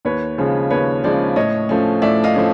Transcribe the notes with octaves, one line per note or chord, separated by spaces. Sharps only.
D#2 B4 C#5
C#3 F3 G#3 C#4
D#2 B4 C#5
C#3 F3 G#3 C#4 C5 D5
A2 C#5 D#5
F3 A3 C#4
A2 D5 E5
D#5 F5
F3 A3 C#4